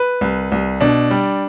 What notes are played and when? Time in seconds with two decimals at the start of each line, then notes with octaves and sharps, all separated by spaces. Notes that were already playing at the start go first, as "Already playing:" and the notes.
Already playing: B4
0.21 C2
0.52 C2
0.81 B2 D4
1.11 G3